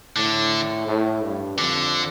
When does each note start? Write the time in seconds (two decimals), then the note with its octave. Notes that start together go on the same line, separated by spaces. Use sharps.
0.16 A2 D3
0.87 A2
1.23 G2
1.58 F2 D3